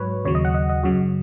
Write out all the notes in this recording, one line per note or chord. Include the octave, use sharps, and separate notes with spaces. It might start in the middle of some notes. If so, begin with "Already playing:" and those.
Already playing: G#2 F#3 B4 C#5
D#2 C#3 F#3 C#5
D#5
F#5
D#5
D#5
F#2 C#3 F#3 F#4